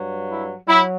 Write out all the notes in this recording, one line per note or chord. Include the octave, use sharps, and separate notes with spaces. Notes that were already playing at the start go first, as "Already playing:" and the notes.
Already playing: G2 F#3
E4
F#3 E4